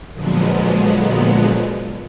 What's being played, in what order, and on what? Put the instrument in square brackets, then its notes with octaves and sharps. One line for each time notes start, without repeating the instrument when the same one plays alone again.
[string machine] A#2 D3 F3 F#3 G#3 B3